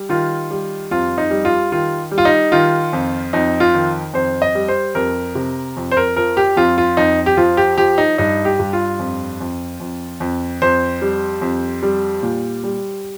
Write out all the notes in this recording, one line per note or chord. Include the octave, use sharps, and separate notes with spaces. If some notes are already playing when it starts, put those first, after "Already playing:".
Already playing: G3
D#3 F4
G3
F2 F4
D#4
G3
F4
D#3 F4
G3
F4
D#4
D#3 F4
F2
F2 D#4
F4
D#3
F2 C5
D#5
G3
C5
F2 A#4
C3
F2
C5
A#4
F3 A#4
G4
F2 F4
F4
F2 D#4
G4
F3 F4
G4
F3 G4
D#4
G2 D#4
G4
G2
F4
F2
F2
F2
F2
F2 C5
G3
F2
G3
A#2
G3